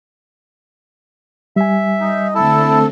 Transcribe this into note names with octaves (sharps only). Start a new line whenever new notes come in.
G3 E5 G#5
D#4
D3 A3 C4 E4 A4 A5